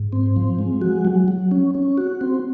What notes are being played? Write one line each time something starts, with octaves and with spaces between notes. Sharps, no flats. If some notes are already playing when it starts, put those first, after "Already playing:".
Already playing: G#2
C4
F3
G#3
F#4
F#3
F#3
C#4
C#4
F#4
C4